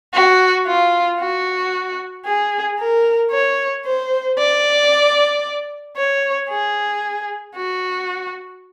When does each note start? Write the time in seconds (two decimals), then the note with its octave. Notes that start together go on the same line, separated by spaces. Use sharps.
0.14 F#4
0.67 F4
1.19 F#4
2.25 G#4
2.79 A#4
3.31 C#5
3.85 C5
4.38 D5
5.97 C#5
6.50 G#4
7.55 F#4